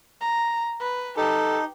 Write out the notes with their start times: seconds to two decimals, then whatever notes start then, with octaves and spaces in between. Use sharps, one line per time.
0.21 A#5
0.80 B4
1.17 D#4 G4 A4